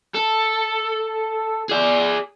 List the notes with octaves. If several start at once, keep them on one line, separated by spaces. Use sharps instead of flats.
A4
G#4 D5